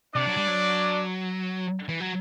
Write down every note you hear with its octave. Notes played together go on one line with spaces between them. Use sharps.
C3 D4 D5
F#3
G3
F#3
E3
F#3